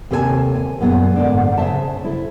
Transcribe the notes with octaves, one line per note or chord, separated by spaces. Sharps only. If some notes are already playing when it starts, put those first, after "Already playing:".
D#2 C3 A4 B4 G#5 A5
G#5
F#2 A#2 B3 G#4
G#2 B2 D3 A#3 D4
C#3 C5 E5 A5
E4 A4